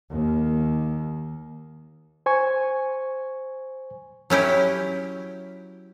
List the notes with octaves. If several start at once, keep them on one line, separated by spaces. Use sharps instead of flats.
D#2
C5 G#5 C#6
F#3 C#4 E4 G4